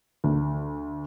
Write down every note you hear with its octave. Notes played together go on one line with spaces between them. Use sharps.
D2